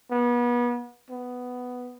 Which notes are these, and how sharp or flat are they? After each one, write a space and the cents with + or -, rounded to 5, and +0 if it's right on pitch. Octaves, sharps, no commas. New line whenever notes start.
B3 -35
B3 +5